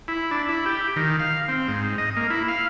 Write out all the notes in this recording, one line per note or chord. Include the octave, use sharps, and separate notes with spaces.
E4
D4
E4
G4
D#3
F5
C4
G#2
D#5
A#3
E4
F5